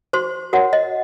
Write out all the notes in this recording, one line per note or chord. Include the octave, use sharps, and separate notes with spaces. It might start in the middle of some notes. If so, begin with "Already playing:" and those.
F#4 C5 C6
F#4 A#4 C#5 F#5
D#5